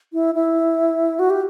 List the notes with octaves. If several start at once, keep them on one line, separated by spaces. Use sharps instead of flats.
E4
E4
F#4
G4